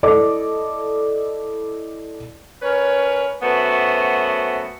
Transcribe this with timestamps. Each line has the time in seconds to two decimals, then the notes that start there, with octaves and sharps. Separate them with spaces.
0.03 E4 A4 D5 D#5 D6
2.62 C#4 A#4 B4 C#5
3.42 F#2 A3 B3 F#4 B4 C5